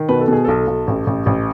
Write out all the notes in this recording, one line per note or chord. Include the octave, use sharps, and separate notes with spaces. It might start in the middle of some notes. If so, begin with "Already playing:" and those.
Already playing: D#3
B2 B4
A4
B2 G#4
B1 A4
B1
A1
A1
A1